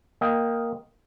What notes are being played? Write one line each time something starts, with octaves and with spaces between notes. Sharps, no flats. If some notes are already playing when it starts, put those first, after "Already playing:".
A#3 D#5 G5